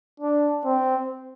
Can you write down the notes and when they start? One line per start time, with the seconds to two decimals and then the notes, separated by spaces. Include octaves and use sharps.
0.20 D4
0.65 C4